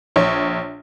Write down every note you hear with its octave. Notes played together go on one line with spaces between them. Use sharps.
A#1 C#5